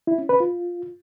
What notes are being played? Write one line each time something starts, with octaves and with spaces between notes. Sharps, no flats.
E4
C#4
B4
F4